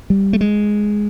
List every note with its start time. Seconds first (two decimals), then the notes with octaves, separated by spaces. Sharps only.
0.10 G3
0.33 A3
0.41 G#3